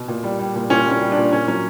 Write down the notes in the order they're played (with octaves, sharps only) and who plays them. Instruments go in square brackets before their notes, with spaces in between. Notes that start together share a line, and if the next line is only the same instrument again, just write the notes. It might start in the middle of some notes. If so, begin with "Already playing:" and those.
Already playing: [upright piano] B2
A#2
G3
G3
A#2
A#2 C#4
G3
C#4
G3
D4
A#2
A#2 C#4
F#3 C#4